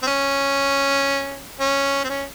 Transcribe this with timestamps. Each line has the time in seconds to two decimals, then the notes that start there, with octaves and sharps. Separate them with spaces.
0.02 C4
0.07 C#4
1.60 C#4
2.04 C4
2.10 C#4